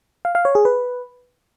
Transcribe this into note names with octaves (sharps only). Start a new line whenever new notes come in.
F5
F5
C#5
G#4
B4